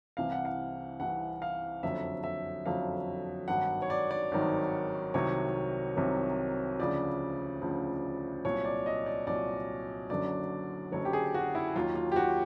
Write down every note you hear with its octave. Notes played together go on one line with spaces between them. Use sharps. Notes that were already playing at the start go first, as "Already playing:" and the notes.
C2 C3 E3 F5
F#5
F5
C2 C3 E3 F#5
F5
F#1 F2 D3 F#3 E5
E5
F#1 F2 D3 F#3 F5
G#1 G2 D#3 F#3 F#5
C#5
D5
D5
G#1 G2 D#3 F#3
C2 C3 D#3 F#3 C#5
C2 C3 D#3 F#3
D2 C#3 F3 D5
D2 C#3 F3
C2 A#2 F#3 C#5
D5
D#5
D5
C2 A#2 F#3 D5
F#1 F#2 D3 F#3 D5
F#1 F#2 D3 F#3 C#5
G4
G#4
F#4
E4
D#2 D#3 F#3 F4
F4
G4
F#4